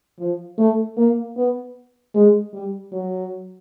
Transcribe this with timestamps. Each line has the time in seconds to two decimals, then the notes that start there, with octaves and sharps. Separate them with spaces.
0.19 F3
0.58 A3
0.97 A#3
1.37 B3
2.15 G#3
2.53 G3
2.92 F#3